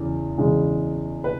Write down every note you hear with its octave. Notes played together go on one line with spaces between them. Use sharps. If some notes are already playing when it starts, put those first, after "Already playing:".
Already playing: E2 C#3
E2 C#3 G#3
B4